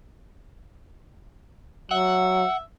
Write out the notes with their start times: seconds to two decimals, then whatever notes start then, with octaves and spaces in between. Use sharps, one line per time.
1.91 F#3 E5 F#5